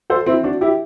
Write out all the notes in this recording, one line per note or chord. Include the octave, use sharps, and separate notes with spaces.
A4 C5
C4 E4
D4 F#4
E4 G4